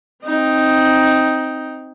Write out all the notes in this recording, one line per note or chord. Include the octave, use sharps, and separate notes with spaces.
C4 D#4